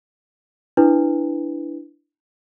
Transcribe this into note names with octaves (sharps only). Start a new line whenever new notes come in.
D4 E4 B4